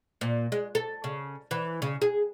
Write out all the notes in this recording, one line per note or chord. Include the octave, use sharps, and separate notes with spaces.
A#2
G#3
A4
C#3
E3
C#3
G#4